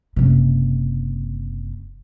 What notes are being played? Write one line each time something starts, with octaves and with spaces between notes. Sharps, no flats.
F#1 C3